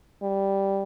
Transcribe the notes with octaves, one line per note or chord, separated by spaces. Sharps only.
G3